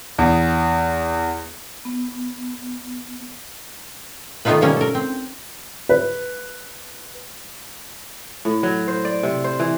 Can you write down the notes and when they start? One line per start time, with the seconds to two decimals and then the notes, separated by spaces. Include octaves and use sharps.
0.18 E2
1.85 B3
4.45 D#3 A3 B3 D#4 F4 B4
4.61 B2 G3 A#3 C#4
4.77 A4 A#4
4.95 C4
5.89 B4
8.45 A2
8.63 F#3
8.88 C5
9.05 D5
9.23 C3
9.44 C5
9.59 E3